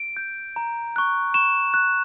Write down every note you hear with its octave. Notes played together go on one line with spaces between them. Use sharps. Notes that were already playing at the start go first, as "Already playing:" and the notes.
Already playing: D7
G6
A#5
C#6 F#6
C#6 E7
F#6